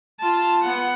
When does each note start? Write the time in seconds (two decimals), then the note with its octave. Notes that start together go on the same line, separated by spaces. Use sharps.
0.19 F4 A5
0.62 B3 F#5